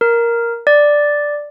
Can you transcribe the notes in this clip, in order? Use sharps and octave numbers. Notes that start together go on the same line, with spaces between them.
A#4
D5